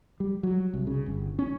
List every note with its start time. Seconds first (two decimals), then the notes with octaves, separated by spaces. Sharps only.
0.20 G3
0.43 F#3
0.74 C2
0.87 C#3
1.06 G1
1.39 C#4